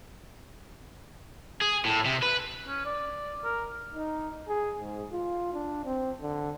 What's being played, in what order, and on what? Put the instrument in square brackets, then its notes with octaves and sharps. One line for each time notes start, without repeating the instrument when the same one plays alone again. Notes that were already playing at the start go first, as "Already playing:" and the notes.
[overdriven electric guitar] G#4
A2
C3
B4
[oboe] C#4
D5
A#4
[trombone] D#4
G#4
G#2
F4
D4
C4
D3